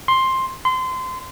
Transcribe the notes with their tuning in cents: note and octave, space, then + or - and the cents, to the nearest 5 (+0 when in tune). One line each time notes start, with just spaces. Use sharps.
C6 +10
C6 -25